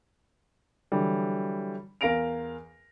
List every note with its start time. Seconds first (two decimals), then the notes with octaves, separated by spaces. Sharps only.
0.92 D3 E3 F#3 G3
2.01 E2 A#4 F5 A#6 D7 F7